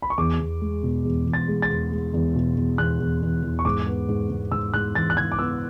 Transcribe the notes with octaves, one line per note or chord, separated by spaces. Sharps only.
B5
C#6
E2 D6
E2
G#3
B2
E2
E2
A6
G#3
A6
E2
G#3
E2
B2
E2
E2 F#6
E2
E2
E2
C#6
G#2 D6
B3
G#2
G#2
G#2 E6
G#2 F#6
E3 A6
F#6
E3 G#6
D6
B3 E6